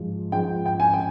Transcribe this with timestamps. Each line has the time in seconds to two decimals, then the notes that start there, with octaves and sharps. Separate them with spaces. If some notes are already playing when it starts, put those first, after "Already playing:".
Already playing: G#2 F3 G#3
0.32 G#2 F3 G#3 G5
0.66 G5
0.80 G#5
0.93 G5